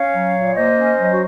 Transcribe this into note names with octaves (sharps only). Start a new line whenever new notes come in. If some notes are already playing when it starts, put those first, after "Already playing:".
Already playing: C#4 C#5 F5
F#3
A#2
A#3 C5 D#5
C#4
F#3
F#4